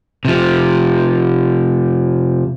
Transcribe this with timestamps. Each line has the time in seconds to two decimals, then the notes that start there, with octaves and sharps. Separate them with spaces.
0.25 C3 F3